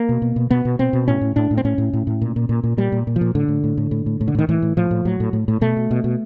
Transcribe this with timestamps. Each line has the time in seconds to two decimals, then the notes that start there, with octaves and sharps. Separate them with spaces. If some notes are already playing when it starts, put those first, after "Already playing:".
Already playing: A#3
0.09 B2
0.22 B2
0.36 B2
0.50 B2 B3
0.65 B2
0.79 B2 C4
0.93 B2
1.08 A2 C#4
1.21 A2
1.36 A2 D4
1.51 A2
1.57 C4
1.65 A2 C#4
1.78 A2
1.93 A2
2.07 A2
2.22 A#2
2.36 A#2
2.49 A#2
2.64 A#2
2.77 A#2 G3
2.92 A#2
3.07 A#2
3.16 F3
3.21 A#2
3.35 A2 D3
3.48 A2
3.64 A2
3.77 A2
3.91 A2
4.06 A2
4.21 A2
4.28 D3
4.35 A2 D#3
4.49 A2 E3
4.62 A2
4.77 A2 F3
4.91 A2
5.05 A2 F#3
5.20 A2
5.33 A2
5.48 A2
5.61 B2 A3
5.77 B2
5.91 B2
6.04 B2